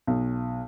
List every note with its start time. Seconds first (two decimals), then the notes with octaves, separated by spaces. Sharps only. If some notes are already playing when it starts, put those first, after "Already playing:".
0.07 B1